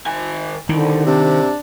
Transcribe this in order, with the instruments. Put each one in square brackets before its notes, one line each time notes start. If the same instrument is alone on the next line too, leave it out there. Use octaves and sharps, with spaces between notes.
[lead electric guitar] D#3 G#5
[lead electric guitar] C2 [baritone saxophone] D3 [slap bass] D#3
[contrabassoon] C3 [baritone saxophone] D4